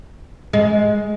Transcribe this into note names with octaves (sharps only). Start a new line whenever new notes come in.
G#3